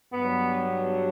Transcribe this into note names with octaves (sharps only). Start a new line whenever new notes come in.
G2 F#3 B3